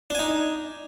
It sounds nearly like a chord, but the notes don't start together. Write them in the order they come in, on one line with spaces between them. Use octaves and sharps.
D4 G#5 D#4